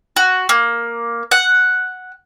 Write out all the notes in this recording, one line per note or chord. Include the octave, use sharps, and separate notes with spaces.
F#4
A#3
F#5